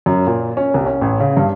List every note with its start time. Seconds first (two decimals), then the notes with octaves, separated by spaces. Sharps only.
0.06 F#2
0.27 A#2
0.57 C#4
0.74 C2
0.86 C#4
1.01 A1
1.20 C#3
1.37 G2